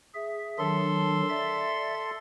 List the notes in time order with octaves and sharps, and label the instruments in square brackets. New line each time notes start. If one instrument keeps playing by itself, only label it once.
[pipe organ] G#4 E5
[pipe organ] D#3 F#3 D4 [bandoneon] A4 C6
[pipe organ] D5 E5 A6